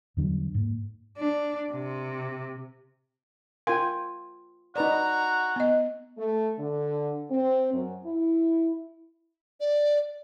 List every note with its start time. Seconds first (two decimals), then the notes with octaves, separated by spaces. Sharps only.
0.17 E2 D3 F#3 G3
0.54 G#2 A#3
1.18 D4
1.72 C3
3.67 F4 A#4 F5 G5 G#5 C6
4.76 D#4 F#4 B4 D5 A#5
5.56 B3 D#5
6.18 A3
6.59 D3
7.30 C4
7.73 F#2
8.05 E4
9.60 D5